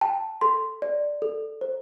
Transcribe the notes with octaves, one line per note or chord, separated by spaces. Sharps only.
G5 A5
A4 C6
D5
A4
C5